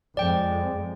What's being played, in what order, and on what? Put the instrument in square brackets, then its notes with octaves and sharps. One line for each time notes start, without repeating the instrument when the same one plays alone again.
[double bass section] F2 G#3 [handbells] D5 G5